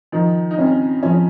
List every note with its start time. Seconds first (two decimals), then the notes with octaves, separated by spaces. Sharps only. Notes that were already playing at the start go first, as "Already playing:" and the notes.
0.12 D#3 F3 D#4
0.51 D#4
0.58 C#3 C4 C#4
1.03 C#3 F3 C#4